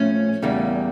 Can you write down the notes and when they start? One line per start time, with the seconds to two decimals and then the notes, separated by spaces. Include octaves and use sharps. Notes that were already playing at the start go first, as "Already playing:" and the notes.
Already playing: A2 F3 A3 C#4
0.42 E2 C#3 G3 A#3